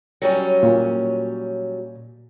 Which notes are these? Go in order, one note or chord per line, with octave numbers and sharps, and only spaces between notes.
F#3 G3 C#4
A#2